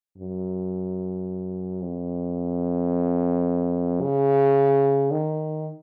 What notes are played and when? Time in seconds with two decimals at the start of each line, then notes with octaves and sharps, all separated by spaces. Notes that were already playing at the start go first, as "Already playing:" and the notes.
0.18 F#2
1.82 F2
4.02 C#3
5.11 D#3